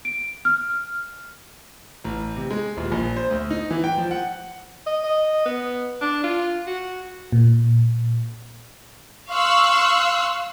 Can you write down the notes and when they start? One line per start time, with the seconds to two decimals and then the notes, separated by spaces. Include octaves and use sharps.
0.05 D7
0.45 F6
2.04 A1
2.36 C3
2.51 G#3
2.77 D#1
2.92 A#1
3.17 C5
3.31 D2
3.50 D#4
3.71 E3
3.84 G5
3.98 F3
4.11 F#5
4.86 D#5
5.04 D#5
5.46 B3
6.01 D4
6.24 F4
6.67 F#4
7.32 A#2
9.30 F5 C6 C#6 E6 F#6